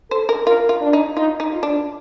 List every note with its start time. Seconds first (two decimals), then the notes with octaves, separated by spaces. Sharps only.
0.11 A4 C5
0.29 A#4
0.46 F4 A#4
0.69 F4
0.81 D4
0.93 D#4
1.16 D#4 F4
1.40 D#4
1.51 F4
1.63 D4